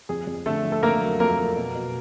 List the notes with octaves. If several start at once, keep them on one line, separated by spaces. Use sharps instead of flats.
F2 G#4
F2
D3 A3 A4
F2
A4
D3 A#3 A#4
F#3
F2 A#3 A#4
F2
B2
B2